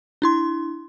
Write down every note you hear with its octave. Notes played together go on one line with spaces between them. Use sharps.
D4 E4 C6